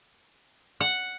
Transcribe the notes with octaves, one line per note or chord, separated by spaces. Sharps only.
F#5